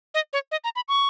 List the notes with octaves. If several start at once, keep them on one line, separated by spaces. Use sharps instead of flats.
D#5
C#5
D#5
A#5
B5
C#6